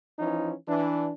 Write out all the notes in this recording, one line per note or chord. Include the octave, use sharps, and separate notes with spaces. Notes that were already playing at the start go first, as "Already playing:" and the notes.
E3 F3 C#4 D#4 E4
E3 D4